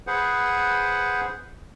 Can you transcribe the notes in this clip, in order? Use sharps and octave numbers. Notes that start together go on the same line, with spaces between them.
G#4 B4 C5 F#5